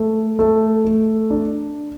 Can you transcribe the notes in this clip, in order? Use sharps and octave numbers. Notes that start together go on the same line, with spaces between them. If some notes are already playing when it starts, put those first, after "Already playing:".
Already playing: A3
A3
A3
D4